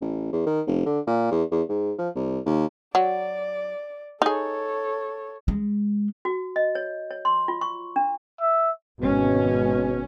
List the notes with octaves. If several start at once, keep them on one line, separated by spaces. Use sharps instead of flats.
A1
E2
D#3
F1
D3
A#2
E2
E2
G#2
F3
C2
D#2
F#3 D5
D#4 G#4 A4 C#5
G#3
F#4
D#5
C#5
C#5
C6
F4
C#6
D4
E5
G#1 B2 C#4